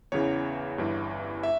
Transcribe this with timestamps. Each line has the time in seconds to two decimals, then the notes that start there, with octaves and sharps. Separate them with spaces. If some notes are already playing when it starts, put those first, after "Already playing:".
0.12 E2 C#3 E3 C#5
0.78 G1 G2 E3
1.43 E5